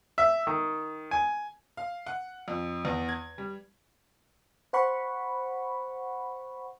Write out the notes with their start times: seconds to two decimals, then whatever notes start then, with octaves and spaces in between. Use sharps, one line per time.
0.18 E5
0.47 D#3
1.11 G#5
1.77 F5
2.06 F#5
2.48 F2
2.85 E2
3.09 G#6
3.38 G3
4.73 C5 F#5 B5 C#6